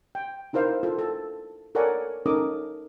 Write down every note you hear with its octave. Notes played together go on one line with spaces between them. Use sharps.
G5
D#4 E4 A#4 C5 F5
F4 A4
A4
A4 A#4 C#5 D5 F#5 G#5
C#4 D#4 A4 A#4 D6 D#6